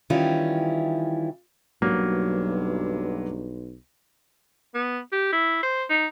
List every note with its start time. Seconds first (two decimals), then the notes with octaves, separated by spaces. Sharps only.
0.10 D#3 E3 G3 C#4 E4 F4
1.82 B1 G2 F#3 A#3
4.74 B3
5.12 G4
5.33 E4
5.63 C5
5.90 D#4